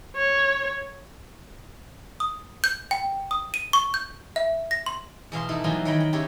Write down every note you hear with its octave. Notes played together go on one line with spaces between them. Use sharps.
C#5
D#6
G6
G5
D#6
D#7
C#6
G6
E5
A#6
C6
E2 B2 F5 C6
D#4 E4 A4 D5
E3 F#3 G3 A#3 D#4 F4
D#3 F#3 C#5 G5 A#5 B5
G5
C#3 E4 G4 C#5 A#5